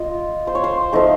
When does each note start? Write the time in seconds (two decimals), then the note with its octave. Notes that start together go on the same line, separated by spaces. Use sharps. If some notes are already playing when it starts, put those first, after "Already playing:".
Already playing: F4 D#5
0.47 C5
0.55 C#5
0.64 C5
0.92 F3 A3 D#4 A4